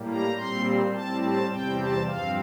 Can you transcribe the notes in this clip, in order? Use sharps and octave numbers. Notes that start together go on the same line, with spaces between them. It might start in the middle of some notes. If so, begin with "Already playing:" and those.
Already playing: A2 G3 A#3
A#5
A#2 G3 C4 C6
A2 G3 C4 A5
A5
E2 C3 G3 C4 G5
A5
G2 F3 C4 F5